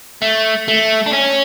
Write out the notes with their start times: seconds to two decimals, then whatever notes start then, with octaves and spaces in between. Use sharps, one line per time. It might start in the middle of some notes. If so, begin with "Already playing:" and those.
0.22 A3
0.68 A3
1.06 D4
1.13 C#4